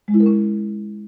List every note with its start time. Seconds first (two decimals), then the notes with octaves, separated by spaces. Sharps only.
0.08 G#3
0.14 E4
0.20 A#4
0.26 C#4